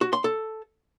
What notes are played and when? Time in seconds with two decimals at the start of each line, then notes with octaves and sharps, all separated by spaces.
0.01 F#4
0.13 C6
0.24 A4